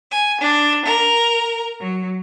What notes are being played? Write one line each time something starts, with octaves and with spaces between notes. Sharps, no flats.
G#5
D4
A#4
F#3